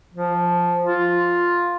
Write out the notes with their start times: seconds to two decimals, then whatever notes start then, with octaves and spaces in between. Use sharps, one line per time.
0.14 F3
0.84 F4